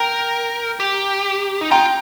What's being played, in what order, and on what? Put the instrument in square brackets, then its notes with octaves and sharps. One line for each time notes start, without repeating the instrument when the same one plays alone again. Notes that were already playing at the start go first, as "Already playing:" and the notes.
Already playing: [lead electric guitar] A#4 [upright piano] G5 A#5
[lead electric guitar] G4
D#4
[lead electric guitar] F4 [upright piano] G5 A#5